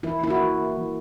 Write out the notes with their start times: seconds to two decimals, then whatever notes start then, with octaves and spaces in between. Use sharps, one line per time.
0.03 E3 E4
0.21 A#3 E4
0.30 F#4
0.41 E3
0.59 A#3
0.77 E3